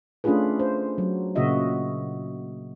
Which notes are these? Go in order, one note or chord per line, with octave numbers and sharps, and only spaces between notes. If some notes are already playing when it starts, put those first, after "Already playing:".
A3 C#4 D4 F4 G#4 B4
C5
F#3
A#2 C#3 A#3 F#4 D#5 E5